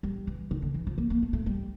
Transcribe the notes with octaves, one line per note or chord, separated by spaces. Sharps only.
G3
E3
D#3
D3
E3
F3
A#3
A#3
A3
A3
G3